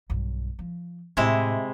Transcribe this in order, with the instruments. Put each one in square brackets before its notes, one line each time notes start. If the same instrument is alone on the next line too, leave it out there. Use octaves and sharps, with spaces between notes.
[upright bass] B1 G2
F3
[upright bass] A2 [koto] C3 G#3 E4